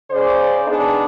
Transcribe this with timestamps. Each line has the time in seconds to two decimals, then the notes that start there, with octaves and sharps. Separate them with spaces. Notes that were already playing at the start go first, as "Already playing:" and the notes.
0.11 C#3 C5 D5
0.67 B3 D4 D#4 G#4 A4